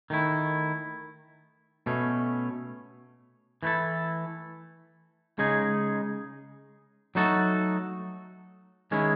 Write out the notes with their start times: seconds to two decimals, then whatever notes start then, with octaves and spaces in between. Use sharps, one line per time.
0.10 D#3 A3 E4
1.86 B2 A3 C#4
3.63 E3 A3 E4 A4
5.39 C#3 G#3 D#4 G#4
7.15 F#3 A3 D#4 F#4 A4
8.91 D#3 G#3 C#4 E4 G#4